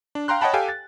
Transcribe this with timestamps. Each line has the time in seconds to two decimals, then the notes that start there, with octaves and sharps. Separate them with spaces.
0.15 D4
0.28 F5 G5 A#5 C6 F#6
0.41 C#5 D#5 F#5 G5 A5 B5
0.53 G4 A4 F5 G5 G#5
0.69 A6